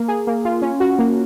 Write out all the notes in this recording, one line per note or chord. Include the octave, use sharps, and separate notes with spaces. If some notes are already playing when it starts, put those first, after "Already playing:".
Already playing: A#3
G#4
A#3
F4
C#4
F#4
A#3